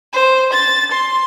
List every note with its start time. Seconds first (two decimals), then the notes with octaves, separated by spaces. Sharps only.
0.13 C5
0.53 A6
0.91 C6